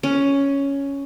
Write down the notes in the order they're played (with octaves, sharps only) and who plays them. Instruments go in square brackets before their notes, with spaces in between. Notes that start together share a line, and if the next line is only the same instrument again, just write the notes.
[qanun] C#4